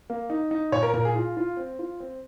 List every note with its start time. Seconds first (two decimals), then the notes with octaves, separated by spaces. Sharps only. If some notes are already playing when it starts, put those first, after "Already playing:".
0.10 A#3
0.30 D#4
0.51 D#4
0.72 A#2 C#5
0.83 A#4
0.94 A#2 A#4
1.05 G#4
1.15 F4
1.37 F4
1.57 C4
1.79 F4
2.00 C4